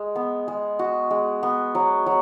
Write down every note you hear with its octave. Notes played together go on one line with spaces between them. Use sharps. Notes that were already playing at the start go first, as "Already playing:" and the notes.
Already playing: G#3
B3
G#3
F#4
G#3
B3
F#3
F#3